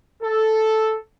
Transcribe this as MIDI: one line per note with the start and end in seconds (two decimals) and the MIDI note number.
0.23 0.95 69